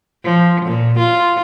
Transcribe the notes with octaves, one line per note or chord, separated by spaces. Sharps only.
F3
A#2
F4